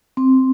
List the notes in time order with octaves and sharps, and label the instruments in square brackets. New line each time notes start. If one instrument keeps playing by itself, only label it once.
[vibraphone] C4